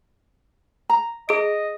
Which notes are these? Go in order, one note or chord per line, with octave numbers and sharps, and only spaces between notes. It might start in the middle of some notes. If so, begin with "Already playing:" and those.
A#5
G#4 D#5 D7